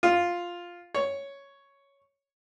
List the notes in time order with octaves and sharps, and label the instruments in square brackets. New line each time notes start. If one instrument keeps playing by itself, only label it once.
[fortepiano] F4
C#5